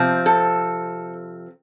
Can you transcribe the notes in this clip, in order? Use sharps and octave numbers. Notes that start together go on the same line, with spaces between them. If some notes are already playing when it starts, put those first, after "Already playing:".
Already playing: C3 F3 C4
A4